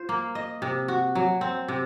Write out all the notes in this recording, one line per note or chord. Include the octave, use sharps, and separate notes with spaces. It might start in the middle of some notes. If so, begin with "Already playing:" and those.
Already playing: F4 C5
A#3
D#5
C3
F#4
F#3
C4
C3